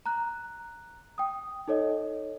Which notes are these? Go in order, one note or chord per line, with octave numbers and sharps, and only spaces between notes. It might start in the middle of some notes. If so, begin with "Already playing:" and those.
A#5 F#6
G5 D#6
D#4 A4 C#5 D#5